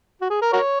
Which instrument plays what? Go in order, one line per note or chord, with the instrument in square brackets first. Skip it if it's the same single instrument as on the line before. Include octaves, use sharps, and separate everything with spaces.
[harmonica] F#4
G#4
A#4
F#4 A#4 C#5